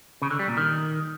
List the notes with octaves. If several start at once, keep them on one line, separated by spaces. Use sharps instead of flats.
C#3
D3
G3
A#2
D#3